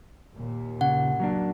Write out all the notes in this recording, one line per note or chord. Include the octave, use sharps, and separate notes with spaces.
D#2 A#2
C#3 F#5
F#3 A#3 D4